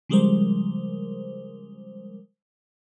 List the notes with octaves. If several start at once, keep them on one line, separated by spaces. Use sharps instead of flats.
C#3 F3 G3 G#3 A#4 C5